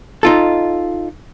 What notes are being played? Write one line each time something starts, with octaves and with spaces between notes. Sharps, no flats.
D#4 F4 A4